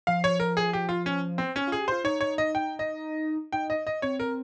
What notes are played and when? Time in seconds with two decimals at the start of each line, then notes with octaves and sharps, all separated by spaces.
0.07 F3 F5
0.24 C#5
0.40 A#4
0.57 G#4
0.73 G4
0.89 F4
1.06 C#4
1.38 C4
1.56 C#4
1.67 F4
1.72 G#4
1.80 G4
1.88 F4 C5
2.04 D#4 C#5
2.21 C#5
2.38 D#5
2.55 G5
2.79 D#5
3.52 D#4 G5
3.70 D#5
3.87 D#5
4.02 C4 C#5
4.20 A#4